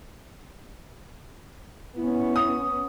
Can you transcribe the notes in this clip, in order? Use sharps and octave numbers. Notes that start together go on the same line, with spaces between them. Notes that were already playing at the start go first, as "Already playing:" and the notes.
B3 C#4 E4
D#6